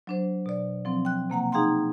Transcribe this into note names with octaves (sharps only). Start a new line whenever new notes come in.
F#3 D4 C5
B2 D5
F3 F#3 C4
G5 F#6
C3 A#3 F#5 A#5
D#4 G#4 F5 G5 A#5 C6